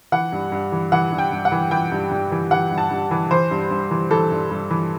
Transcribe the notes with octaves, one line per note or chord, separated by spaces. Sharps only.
E3 F#5
G2
G2
E3
E3 F#5
G2
G5
G2
F#5
E3
E3 G5
G2
G2
E3
E3 F#5
G2
A5
G2
E3
E3 C5
G2
G2
E3
E3 A4
G2
G2
E3